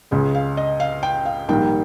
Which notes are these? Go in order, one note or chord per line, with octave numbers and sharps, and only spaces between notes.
C#2 C#3 G#3
F5
D#5
F5
G5
F5
A#1 G#2 D#3 G3 A#3 G5